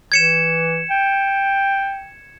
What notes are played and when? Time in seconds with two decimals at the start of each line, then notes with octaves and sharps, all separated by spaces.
0.12 E3 G#6 C#7 E7
0.90 G5